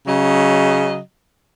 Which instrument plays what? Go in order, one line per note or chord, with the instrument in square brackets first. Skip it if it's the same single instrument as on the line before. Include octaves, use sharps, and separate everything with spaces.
[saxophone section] C#3 F#3 D#5